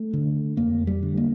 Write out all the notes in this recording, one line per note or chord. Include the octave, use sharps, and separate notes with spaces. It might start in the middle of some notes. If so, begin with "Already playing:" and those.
Already playing: A3
D3
F2 A#3
G3
D3
A#3